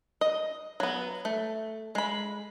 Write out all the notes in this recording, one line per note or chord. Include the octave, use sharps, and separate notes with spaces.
D#5
F#3 B3
A3
G#3 B5